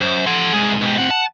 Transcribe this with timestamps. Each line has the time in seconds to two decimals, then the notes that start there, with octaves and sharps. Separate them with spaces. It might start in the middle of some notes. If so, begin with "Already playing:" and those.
0.01 F#2 C5
0.26 F3 A4 F#5 C6
0.53 C2 G#2 G#4
0.82 B2 G4
0.98 A2 C4 F#5
1.11 A5